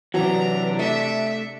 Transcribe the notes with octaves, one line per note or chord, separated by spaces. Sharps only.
C3 E3 F#3 D4 F#4 A#5
A3 E5